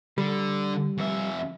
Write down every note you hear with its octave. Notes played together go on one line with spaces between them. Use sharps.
D3 G3
F2 E5